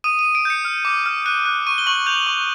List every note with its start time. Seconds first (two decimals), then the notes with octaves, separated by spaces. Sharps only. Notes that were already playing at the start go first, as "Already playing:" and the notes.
0.04 D#6 D#7
0.19 D#7
0.25 D#6
0.35 D7
0.45 G6 C#7
0.65 F6
0.85 D6
1.06 F6
1.26 F#6 D#7
1.45 F#6
1.67 C#6 D#7
1.78 G7
1.87 C#6 F#7
2.06 G6 F7
2.26 C#6